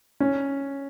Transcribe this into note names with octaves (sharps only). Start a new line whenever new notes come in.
C#4